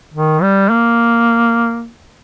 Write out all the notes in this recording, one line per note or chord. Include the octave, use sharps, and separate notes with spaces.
D#3
G3
A#3